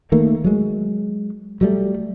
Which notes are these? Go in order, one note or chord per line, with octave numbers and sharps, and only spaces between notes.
D#3 A3 A#3
F#3 G#3
F#3 G3 A3